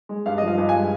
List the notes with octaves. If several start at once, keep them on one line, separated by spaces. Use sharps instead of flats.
G#3
G2 F5
F3 D#5
F5
G2
G#5
G#3